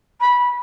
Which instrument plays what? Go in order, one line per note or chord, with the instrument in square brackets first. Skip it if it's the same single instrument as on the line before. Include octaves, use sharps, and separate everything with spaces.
[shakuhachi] B5